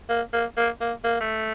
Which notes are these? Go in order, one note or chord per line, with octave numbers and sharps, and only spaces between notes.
A#3
A#3
A#3
A#3
A#3
A3